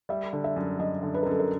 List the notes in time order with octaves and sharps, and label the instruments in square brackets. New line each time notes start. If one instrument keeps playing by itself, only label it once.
[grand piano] G3 [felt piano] E5
[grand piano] D3
[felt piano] E5
[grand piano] F#2
[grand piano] F#2 [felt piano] D#5
[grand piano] D3
[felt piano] B4
A#4
[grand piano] F#2 [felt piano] A4
[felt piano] A#4